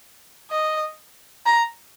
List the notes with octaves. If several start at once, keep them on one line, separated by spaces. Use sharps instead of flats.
D#5
A#5